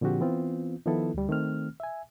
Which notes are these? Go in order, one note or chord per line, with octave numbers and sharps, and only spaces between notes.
A#2 D3 F3 C4 F#4 G4
E3 B3 C4 F4
D#3 F3 B3 E4 A4
D2 G3
D#3 A3 C4 F6
E5 G#5